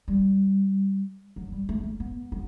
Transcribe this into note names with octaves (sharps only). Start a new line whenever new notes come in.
G3
F#3
G3
A3
C#4
B3
F#3